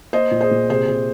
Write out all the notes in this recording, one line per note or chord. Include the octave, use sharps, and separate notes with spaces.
A#3 C5 D#5
A#2
G#4 C5
A#2
C3 G#4 C5
C3